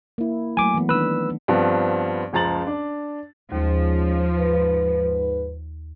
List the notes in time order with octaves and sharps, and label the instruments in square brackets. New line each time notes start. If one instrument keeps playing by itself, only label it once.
[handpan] A#3 E4
[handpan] F#3 A3 [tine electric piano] G#5 D6
[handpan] E3 B3
[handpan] D#3 D4 [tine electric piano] B4 E6
[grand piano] G2 F3 B3 C4
F#1 C#2 F3 A#5 A6 F#7
D4
[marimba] D#2 [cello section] F3 [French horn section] G#3 C#4
[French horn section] G#2 B4